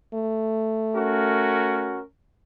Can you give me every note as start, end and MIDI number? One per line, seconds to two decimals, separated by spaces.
0.14 2.01 57
0.96 2.01 61
0.96 2.01 66
0.96 2.01 70